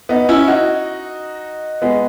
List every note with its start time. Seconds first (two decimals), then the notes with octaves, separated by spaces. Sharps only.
0.09 B3 D#4
0.29 C#4 E4
0.48 D#4 F#4
1.82 G#3 B3